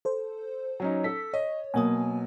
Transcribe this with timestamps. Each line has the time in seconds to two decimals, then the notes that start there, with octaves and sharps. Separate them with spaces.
0.05 A4 C5
0.80 F#3 C#4 D#4
1.04 A4 B6
1.34 C#5 D#5
1.74 B2 F#3 A#3 G#5 D#6